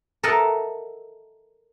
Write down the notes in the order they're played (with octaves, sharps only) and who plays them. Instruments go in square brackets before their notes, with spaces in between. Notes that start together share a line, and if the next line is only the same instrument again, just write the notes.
[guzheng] A4 A#4 D#5 E5 F#5 A5